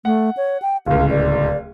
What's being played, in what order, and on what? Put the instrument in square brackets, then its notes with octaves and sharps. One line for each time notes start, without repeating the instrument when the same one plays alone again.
[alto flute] A3 [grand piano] F#5
[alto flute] C#5
G5
[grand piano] D1 C#2 [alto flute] F5
[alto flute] D5